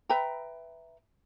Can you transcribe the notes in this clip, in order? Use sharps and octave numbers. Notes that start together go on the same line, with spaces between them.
B4 E5 G5 A#5